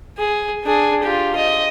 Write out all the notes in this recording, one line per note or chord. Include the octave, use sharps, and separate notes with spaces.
G#4
D4 G#4
F4 G4
D#5